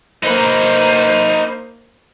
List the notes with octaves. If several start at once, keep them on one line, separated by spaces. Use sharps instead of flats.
A#3 D#4 B4 C5